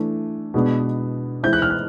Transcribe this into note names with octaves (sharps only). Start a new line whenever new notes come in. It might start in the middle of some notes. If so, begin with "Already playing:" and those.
Already playing: E3 A3 D4
B2 G#3 B3 D4
E3 G#3 C4 E4 G6
F#6
F6
F#6